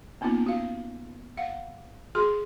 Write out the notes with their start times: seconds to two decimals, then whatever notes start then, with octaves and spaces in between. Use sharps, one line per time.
0.21 A#3 B3 C#4 D#4 F4
0.46 F#4 F5
1.37 F5 F#5
2.15 F#4 G#4 C6